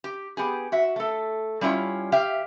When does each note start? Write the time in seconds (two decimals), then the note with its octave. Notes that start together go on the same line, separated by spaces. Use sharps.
0.04 G4
0.37 B3 G4 G#4
0.72 F#4 E5
0.96 A3 A4
1.61 G3 C#4 E4 F4 C#5
2.12 G4 E5 F5 G5